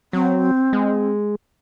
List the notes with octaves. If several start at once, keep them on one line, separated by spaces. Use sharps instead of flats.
F#3 C4
G#3